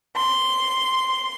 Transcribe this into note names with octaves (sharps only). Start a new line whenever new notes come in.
C6